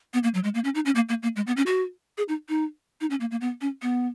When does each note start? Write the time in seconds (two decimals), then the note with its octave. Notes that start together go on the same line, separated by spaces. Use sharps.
0.14 B3
0.23 A#3
0.34 F#3
0.44 G#3
0.54 A#3
0.64 C#4
0.75 D#4
0.86 C#4
0.95 A#3
1.09 A#3
1.23 A#3
1.36 G#3
1.47 B3
1.57 C#4
1.66 F#4
2.18 G#4
2.29 D#4
2.49 D#4
3.01 D#4
3.10 C#4
3.20 A#3
3.31 A#3
3.41 B3
3.61 C#4
3.82 B3